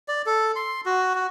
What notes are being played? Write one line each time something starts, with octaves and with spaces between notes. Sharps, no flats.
D5
A4
C6
F#4
F#4